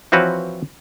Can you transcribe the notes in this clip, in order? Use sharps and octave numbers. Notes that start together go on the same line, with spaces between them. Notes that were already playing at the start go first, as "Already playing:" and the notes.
E3 F3 C4 F#4 B4 C#5